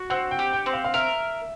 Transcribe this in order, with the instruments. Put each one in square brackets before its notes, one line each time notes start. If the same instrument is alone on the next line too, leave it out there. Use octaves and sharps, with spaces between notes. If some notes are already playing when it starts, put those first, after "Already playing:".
Already playing: [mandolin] F#4
[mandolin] C4 [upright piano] F#5
[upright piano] G5
[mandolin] G4
[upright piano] G5
[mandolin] C4
[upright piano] F5
F5
[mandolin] A#4 [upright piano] E5